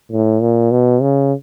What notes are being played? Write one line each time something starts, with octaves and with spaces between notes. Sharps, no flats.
A2
A#2
B2
C#3